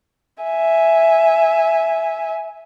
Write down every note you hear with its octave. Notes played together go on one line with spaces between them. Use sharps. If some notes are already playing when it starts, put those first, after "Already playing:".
E5 G#5